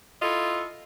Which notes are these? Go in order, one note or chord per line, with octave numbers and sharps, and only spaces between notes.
E4 F4 A4 D#5